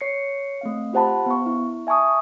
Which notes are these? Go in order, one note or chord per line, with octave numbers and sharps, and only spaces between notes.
C#5 C7 C#7
A3 C4 F5
F4 G4 C5 F#5 A5 B5
B3 C#6
E4
E5 G#5 A5 C#6 D#6